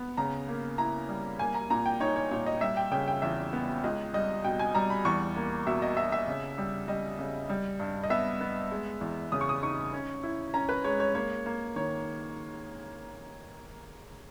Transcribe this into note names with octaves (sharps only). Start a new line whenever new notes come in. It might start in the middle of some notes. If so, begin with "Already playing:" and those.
Already playing: B3
C#3 A#5
A#3
E4 A#5
G3
A#3 G#5
A#5
A#2 A#5
G5
D#4 C#5
C#5
A#2 C#5
D#5
G3 E5
G5
C#3 G5
G5
E2 E5
B3
C#2 D#5
G3 D#5
B2 G5
G#5
G3 A#5
B5
E2 C#6
A#3
B2 E5
D#5
B2 E5
E5
C#3
G3
G3 D#5
C#3
G3
G2
D#5
B3 E5
B3
G#3
E2
C#3 D#6
C#6
D#6
D#4 C#6
C#4
E4
C#4 A#5
B4
G#3 C#5
C#5
A#3 C#5
A#3
D#3 C#5